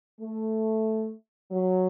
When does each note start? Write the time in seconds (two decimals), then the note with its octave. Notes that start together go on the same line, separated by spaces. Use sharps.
0.21 A3
1.51 F#3